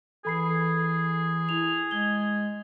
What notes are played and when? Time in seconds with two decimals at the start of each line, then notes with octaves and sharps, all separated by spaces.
0.25 E3 G#4 A4 B5 C7
1.49 E4 F7
1.91 G#3 G#6 G7